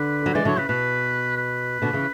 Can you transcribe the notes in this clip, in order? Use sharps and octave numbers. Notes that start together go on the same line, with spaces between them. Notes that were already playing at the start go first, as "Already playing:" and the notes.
Already playing: D3 B4
F#3
E3 G#3 D5
D3 F#3 C#5
C#3 B4
B2 B4
B4
B2 D3
C#3 E3